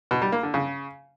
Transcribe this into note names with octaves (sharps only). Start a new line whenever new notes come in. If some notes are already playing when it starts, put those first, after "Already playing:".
B2
G3
A#3
D3
C#3